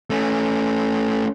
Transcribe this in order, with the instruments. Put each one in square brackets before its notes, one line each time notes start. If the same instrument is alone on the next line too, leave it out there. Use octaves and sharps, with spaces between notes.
[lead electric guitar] A3 C#4